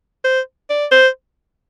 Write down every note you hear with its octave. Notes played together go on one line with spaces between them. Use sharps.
C5
D5
C5